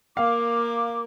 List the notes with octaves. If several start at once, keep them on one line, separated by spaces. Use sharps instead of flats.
A#3 A#4 F5 D6